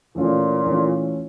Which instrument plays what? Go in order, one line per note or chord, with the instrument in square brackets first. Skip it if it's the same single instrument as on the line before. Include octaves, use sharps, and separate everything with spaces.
[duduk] A#2 [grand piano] E3 A3 C#4 F4
[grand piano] E3 A3 C#4 F4